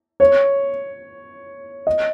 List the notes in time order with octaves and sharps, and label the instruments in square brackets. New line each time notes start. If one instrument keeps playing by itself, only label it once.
[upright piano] C#5
D#5